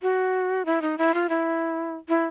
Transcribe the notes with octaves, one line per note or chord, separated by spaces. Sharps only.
F#4
E4
D#4
E4
F4
E4
E4